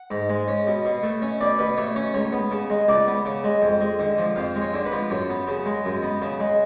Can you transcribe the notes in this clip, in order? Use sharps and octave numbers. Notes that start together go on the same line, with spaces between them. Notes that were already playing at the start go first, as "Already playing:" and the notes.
Already playing: F#5
G#2
G#3
C#4
B2
B2
A3
C#4
B2 D5
B2 B4
A3 C#5
C#4 C#5
C#2 C#5
B3
C#3
G#3
C#2 D5
B3
C#3
G#3
F2
G#3
D3
F3
F2 F5
G#3
C#5
D3
B4
F3
F#2 C#5
B3
C#3
G#3
F#2
B3
C#3
G#3